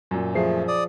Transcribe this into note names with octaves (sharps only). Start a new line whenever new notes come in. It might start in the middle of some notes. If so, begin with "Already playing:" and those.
F#2 A#2
F3 A3 G#4 C7
D5 D#6